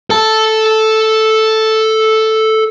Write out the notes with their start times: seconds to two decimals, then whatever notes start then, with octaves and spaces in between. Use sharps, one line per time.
0.10 A4 A5